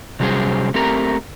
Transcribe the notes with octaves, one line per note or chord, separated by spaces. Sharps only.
C3 F#3 G3 C#4 G#4 C5
A3 C4 G4 A#4 A#5